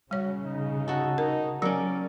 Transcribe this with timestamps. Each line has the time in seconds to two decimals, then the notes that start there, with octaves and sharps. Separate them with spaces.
0.11 C#3 G3 F#4 C#5
0.44 D#4
0.88 F#4 A4
1.18 D#4 A#4
1.62 F#3 C#4 A#4 D5